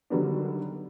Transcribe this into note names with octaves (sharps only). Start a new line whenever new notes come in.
D3 D#3 F#3 G3 B3 D4